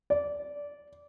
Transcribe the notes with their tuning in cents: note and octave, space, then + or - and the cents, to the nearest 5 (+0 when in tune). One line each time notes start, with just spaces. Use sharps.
D5 -15